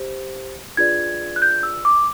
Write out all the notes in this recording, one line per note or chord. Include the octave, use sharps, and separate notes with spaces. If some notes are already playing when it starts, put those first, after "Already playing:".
Already playing: G4 C5
D4 F4 G#4 B4 D5 G#6
F#6
G6
E6
D6